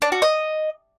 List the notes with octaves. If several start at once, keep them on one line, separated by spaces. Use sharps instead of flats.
D4
F#4
D#5